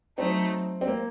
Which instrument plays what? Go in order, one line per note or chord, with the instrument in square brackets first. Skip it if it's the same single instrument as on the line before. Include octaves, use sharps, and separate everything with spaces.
[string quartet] F#3 A3 D#4 [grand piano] C4
[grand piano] C4
A#3